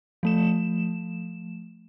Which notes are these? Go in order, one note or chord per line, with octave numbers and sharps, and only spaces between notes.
F3 A3 E7